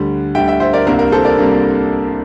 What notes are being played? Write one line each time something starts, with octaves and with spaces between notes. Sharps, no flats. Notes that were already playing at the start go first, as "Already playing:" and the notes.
Already playing: D2 D3 G3
D2 D3 G3 E5 G5
E5 G5
C5 E5
A#4 D5
C2 C3 G3 A#3 D4 A#4
A#4
A4 C5
A#4 D5
C3 G3 A#3 D4